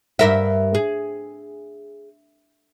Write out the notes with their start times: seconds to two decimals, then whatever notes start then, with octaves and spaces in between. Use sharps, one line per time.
0.19 G2 A#4 E5
0.74 G#4